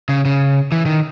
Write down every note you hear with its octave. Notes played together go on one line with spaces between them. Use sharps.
C#3
C#3
E3
D#3